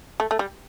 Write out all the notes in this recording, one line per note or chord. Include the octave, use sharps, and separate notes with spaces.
A3
A3
G3